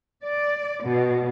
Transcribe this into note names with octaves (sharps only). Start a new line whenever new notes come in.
D5
B2